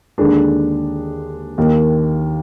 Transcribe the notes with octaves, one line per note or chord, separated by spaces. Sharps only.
D#2 D3 G#3 D4
D#2 D#3 A#3